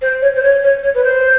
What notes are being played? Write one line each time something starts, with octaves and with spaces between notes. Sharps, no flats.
C5
C#5
C5
C#5
C#5
C#5
B4
C5